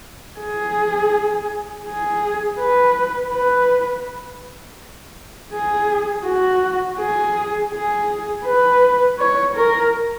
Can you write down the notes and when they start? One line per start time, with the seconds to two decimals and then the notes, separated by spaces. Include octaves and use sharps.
0.39 G#4
1.86 G#4
2.59 B4
3.33 B4
5.53 G#4
6.25 F#4
6.98 G#4
7.72 G#4
8.46 B4
9.19 C#5
9.55 A#4